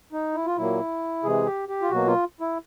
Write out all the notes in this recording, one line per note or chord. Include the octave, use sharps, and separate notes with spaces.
D#4
E4
F4
A#2 F#3 A#3 E4
C3 E3 G#3 G#4
G4
G4
F4
B2 F#3 A#3 F#4
F4
E4